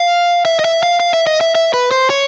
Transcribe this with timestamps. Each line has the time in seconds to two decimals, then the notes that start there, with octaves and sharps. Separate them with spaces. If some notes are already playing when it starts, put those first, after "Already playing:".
Already playing: F5
0.45 E5
0.59 D#5
0.65 E5
0.83 F5
1.00 F5
1.14 E5
1.27 D#5
1.41 E5
1.55 E5
1.74 B4
1.91 C5
2.10 C#5